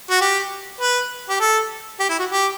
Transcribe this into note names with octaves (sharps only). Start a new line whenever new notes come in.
F#4
G4
B4
G4
A4
G4
E4
F#4
G4